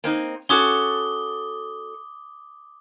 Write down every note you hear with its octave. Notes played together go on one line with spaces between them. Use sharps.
A#3 C4 D#4
C#4 F#4 A4 D6 D#6 G7